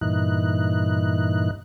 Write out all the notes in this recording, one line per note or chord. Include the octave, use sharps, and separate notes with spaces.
G2 A#2 E3 D#4 F#6